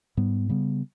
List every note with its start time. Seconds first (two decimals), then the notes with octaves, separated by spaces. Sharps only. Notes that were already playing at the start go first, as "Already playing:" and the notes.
0.17 G#2 G3 B3
0.49 C#3 G3 B3